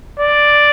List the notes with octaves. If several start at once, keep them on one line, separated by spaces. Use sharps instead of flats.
D5